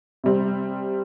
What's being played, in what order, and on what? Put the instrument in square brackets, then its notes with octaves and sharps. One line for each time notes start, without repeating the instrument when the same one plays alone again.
[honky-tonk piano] C3 G3 C4